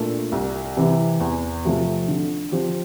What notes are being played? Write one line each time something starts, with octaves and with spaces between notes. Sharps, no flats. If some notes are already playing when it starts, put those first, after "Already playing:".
Already playing: A#2 A3 D4 A4
C2
C3 E3
E2
C3 F3 A3
D3
F3 C4 G4